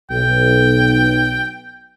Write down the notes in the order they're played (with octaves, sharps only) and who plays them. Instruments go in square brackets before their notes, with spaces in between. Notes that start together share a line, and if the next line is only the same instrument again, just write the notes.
[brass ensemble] B1 [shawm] G5